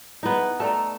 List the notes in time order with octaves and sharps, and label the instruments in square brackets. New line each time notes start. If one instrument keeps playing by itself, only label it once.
[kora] B3 D#4 [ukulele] E4 G#4 B4
[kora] A3 [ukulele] A4 D5 A#5